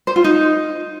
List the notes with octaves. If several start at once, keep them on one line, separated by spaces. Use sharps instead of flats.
C5
F4
D#4